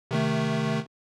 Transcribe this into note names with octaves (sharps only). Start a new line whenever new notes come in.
C3 D#3 A3